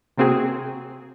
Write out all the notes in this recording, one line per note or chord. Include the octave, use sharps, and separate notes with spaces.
C3 A#3 C4 F#4 G#4